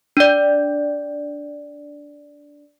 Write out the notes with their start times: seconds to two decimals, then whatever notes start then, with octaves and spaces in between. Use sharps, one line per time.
0.17 D4 D5